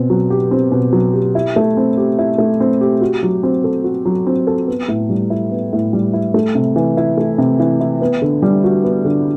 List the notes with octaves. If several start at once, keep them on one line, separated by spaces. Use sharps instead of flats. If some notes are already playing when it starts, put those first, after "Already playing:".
Already playing: B2 C4
F#3
G4
C4
B2
F#3
G4
E4
A3
C4
G4
E4
A3
C4
G4
F#4
F#3
C4
A4
F#4
F#3
C4
A4
B3
A2
G3
E4
B3
A2
G3
E4
A3
C3
E3
E4
A3
C3
E3
E4
B3
D3
G3
F#4
B3
D3